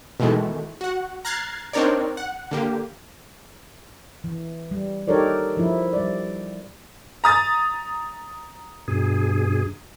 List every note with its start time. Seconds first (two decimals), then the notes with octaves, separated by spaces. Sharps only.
0.20 B2 D#3 E3 G#3 A3
0.81 F#4 F#5
1.25 A#5 F6 F#6 G#6 A6 C7
1.73 C4 D4 D#4 A#4 C#5 D5
2.17 F#5
2.51 D3 A#3 G4
4.24 E3
4.71 G3
5.08 D#4 G4 A4 A#4 C#5 D5
5.57 F3 E4
5.93 G3 D5
7.24 A#5 D#6 A6
8.88 G2 B2 G#4